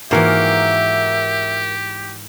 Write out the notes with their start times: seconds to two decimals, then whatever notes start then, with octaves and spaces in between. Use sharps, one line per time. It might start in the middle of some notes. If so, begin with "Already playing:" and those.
0.11 G#2 E3 A#3 F#4 G4 A#4 E5